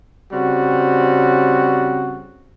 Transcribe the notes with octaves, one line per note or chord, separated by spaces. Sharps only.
C#3 G3 C4 F#4